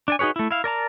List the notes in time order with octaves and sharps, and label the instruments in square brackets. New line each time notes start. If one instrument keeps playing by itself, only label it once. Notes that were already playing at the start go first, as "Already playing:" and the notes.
[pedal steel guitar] D4 D5 G#5
D#4 F#4 G#4 B4 C#5
A3 E4
E4 F5
A#4 D5 A5 A#5